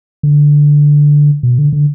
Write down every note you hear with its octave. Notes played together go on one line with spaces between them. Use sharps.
D3
B2
D3
D3